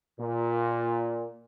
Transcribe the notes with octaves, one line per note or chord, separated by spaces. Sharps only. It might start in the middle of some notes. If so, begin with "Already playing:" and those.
A#2